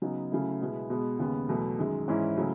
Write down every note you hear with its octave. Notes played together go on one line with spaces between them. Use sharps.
C#3 F#3 B3 D#4
C#3 F#3 A3 E4
B2 G#3 B3 E4
B2 G#3 B3
D#2 C#3 G#3 B3
E2 B2 F#3 A3
F#2 D#3 G#3
G#2 E3 G#3 C#4 E4
C#3 F#3 A3 E4